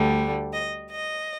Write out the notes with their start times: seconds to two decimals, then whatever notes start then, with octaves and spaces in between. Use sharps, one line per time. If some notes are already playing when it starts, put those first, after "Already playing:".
Already playing: D2 D3 G3
0.52 D#5
0.90 D#5